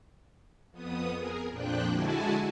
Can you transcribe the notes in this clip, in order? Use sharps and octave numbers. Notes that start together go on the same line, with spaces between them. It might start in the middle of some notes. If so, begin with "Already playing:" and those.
F2 B3 D#6
G#4 A#4
F2 A#2 F3 D4 G5 F#6
D3 G#3 E4 F#4 G#5 A5